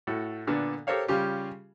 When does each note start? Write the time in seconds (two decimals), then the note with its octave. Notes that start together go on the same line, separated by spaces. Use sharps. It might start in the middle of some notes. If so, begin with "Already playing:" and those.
0.07 A2 F#4 A4
0.47 A#2 D3 B3 D4
0.87 G4 A4 A#4 C5 C#5 F5
1.08 C#3 G3 C#4 F4 G4